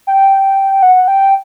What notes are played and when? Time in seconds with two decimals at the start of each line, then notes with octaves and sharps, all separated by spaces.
0.07 G5
0.83 F#5
1.08 G5